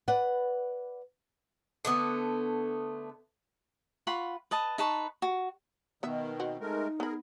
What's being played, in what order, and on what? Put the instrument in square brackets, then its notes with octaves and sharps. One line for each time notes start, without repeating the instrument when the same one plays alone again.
[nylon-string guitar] B4 D5 F#5
[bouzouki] D3 A3 B3
[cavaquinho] F4 F#5 B5 C#6
B4 D#5 A5
D#4 B4 A5 C#6
F#4
[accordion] B2 D#3 [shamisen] B3 E5
[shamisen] C4 F#4
[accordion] G#3 A3 A#4 [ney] D#4
[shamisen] B3 B5 [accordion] G#4 A#4